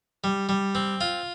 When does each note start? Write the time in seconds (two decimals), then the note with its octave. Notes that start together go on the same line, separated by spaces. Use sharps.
0.24 G3
0.49 G3
0.75 C4
1.01 F4